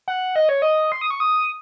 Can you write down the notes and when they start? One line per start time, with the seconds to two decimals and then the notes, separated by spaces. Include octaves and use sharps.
0.08 F#5
0.36 D#5
0.49 C#5
0.62 D#5
0.92 C6
1.01 D#6
1.11 C#6
1.20 D#6